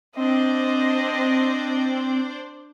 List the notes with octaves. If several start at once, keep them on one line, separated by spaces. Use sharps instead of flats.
C4 D4 C5 D5 D#5